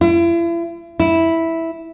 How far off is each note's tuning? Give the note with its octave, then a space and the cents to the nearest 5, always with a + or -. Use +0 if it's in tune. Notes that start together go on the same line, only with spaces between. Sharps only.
E4 +40
E4 -5